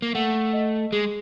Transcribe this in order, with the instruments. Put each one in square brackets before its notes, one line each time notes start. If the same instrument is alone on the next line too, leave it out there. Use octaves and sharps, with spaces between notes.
[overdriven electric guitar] A#3
[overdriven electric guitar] A3 [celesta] F#5
[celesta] D#5
[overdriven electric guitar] G#3 [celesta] G#4